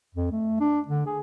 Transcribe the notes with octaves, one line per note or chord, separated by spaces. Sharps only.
F2
A3
D4
D3
G#4